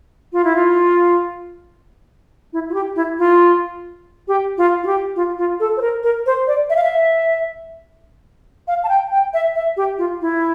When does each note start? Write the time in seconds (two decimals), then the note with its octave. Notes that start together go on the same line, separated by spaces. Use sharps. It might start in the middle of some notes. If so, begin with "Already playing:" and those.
0.33 F4
0.45 E4
0.56 F4
2.53 E4
2.69 F4
2.74 G4
2.96 E4
3.19 F4
4.28 G4
4.58 F4
4.83 F4
4.86 G4
5.16 F4
5.38 F4
5.60 A4
5.77 C5
5.81 A#4
6.03 A#4
6.26 C5
6.47 D5
6.70 E5
6.76 F5
6.84 E5
8.68 F5
8.84 A5
8.89 G5
9.12 G5
9.34 E5
9.56 E5
9.77 G4
9.98 F4
10.21 E4